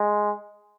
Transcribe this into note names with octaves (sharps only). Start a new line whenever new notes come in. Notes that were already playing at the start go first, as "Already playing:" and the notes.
Already playing: G#3